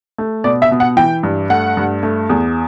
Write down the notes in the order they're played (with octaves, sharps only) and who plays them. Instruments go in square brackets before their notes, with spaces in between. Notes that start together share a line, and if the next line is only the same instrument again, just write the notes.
[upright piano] A3
B2 D5
E5
B2
F#5
E3 G5
G2
A3 F#5
G2
A3
E2